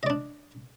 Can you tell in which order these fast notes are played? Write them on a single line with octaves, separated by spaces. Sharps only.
D#5 D5 D4